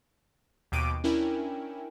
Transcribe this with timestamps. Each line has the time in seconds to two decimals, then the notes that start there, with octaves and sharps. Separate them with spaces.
0.72 D#2 B2 G5 D6 D7 D#7
1.04 C#4 D4 E4 A#4 G5 G#5